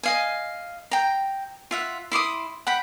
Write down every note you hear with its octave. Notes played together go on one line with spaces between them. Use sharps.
D#5 F5 G#5
G5 A#5
F4 E5 F#5
E4 C6 D6 D#6
F#5 G5 B5